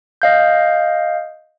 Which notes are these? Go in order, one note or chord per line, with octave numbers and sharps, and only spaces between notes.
D#5 F5 G6